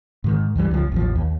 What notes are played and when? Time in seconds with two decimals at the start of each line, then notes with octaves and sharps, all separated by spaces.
0.24 G#2 D#3
0.56 D2 G2 E3 G3
0.71 C#2 F3
0.92 A1 D#2 F3
1.16 D#2